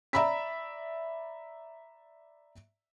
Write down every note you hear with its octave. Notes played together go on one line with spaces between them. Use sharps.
D5 E5 A#5 B5 E6 B6